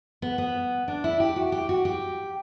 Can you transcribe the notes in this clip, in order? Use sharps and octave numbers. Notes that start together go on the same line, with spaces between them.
B3
B3
D4
E4
G4
F#4
G4
F#4
G4